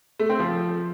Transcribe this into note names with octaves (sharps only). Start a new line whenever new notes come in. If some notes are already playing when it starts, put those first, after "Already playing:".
A3
C4
F3